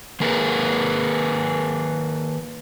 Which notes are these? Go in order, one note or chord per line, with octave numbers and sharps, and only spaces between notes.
D#3 A#3 G#4 A#4 B4